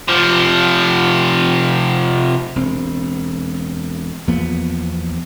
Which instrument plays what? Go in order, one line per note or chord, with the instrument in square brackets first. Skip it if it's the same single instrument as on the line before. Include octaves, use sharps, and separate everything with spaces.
[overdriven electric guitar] C3 F3
[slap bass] E1 C4
E2 F3 A#3 B3